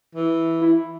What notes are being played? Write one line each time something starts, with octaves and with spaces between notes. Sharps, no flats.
E3
E4